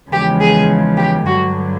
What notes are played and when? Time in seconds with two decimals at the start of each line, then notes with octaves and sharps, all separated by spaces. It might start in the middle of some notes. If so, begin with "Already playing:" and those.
0.11 E2 C#3 F3 G#3 G4
0.40 G#4
0.97 G4
1.26 G2 D3 F#3 F#4